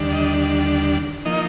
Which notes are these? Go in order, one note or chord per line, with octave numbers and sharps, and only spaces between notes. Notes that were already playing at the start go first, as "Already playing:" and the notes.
Already playing: D#2 D3 G3 D4
D#5
F3 A#3 D#4 D#5